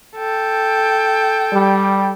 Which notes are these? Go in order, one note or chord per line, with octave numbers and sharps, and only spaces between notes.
A4 G5
G3